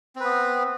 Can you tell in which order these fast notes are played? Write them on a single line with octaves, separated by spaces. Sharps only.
C4 B4 B3